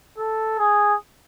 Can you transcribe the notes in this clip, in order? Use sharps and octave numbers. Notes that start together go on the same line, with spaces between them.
A4
G#4